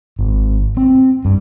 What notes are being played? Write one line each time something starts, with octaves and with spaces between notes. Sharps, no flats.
G#1
C4
G2